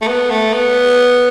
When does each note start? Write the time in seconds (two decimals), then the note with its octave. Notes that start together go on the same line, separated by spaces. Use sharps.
0.02 A3
0.07 B3
0.30 A3
0.54 B3